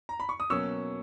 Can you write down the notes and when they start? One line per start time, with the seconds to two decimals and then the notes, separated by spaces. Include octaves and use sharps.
0.09 A#5
0.20 B5
0.29 C#6
0.40 D#6
0.50 B2 F#3 A#3 C#4 C#6 E6